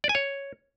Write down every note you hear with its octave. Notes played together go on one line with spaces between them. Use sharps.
D5
G#5
C#5